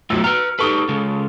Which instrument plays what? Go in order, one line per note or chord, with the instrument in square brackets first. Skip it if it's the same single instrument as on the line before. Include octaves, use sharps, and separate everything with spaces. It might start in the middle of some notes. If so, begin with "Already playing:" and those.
[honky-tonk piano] B1 E6 [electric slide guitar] A3 F4
[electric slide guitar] B4 A#5 [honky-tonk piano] F6 C#7
[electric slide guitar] D#4 G4 B4 [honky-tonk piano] A4 C#6 D#6
[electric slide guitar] C#3 G#3